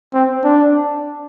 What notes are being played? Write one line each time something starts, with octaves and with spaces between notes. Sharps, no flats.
C4
D4